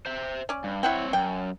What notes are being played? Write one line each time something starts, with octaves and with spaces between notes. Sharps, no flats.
C5 E5
C#4 D5
G2
C4 E4 C#5 F#5 G5
F#2 G5